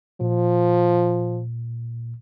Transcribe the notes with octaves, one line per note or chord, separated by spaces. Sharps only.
A#2 F3